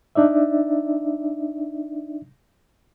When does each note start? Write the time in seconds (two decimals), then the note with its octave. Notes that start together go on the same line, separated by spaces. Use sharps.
0.15 D4 D#4 D5 E5